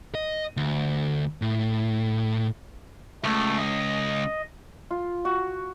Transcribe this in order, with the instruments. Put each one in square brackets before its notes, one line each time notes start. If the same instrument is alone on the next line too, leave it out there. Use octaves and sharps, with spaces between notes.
[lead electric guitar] D#5
D2
A2
[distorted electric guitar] C#2 [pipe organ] A3
[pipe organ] D#5
[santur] F4
F#4